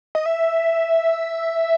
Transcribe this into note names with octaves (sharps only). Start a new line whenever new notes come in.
D#5
E5